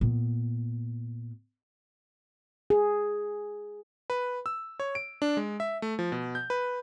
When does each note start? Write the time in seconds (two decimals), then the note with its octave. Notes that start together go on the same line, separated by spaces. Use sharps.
0.01 A#2 B3
2.70 G#4
4.10 B4
4.46 E6
4.80 C#5
4.95 D7
5.22 D4
5.37 G#3
5.60 E5
5.82 A3
5.99 F3
6.12 B2
6.35 G6
6.50 B4